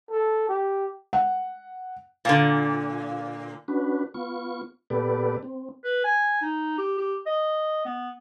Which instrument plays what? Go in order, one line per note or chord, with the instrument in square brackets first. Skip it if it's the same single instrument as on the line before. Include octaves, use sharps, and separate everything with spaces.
[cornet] A4
G4
[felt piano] F#5
[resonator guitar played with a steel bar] A#2 D3
[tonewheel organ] C#4 D4 F#4 B4
B3 F4 C#6
A#2 B3 G4 A4 B4 D5
C4
[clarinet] B4
G#5
D#4
G4
G4
D#5
B3